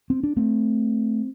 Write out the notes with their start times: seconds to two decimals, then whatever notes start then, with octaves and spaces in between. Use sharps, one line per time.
0.10 C4
0.23 D4
0.37 A3 C4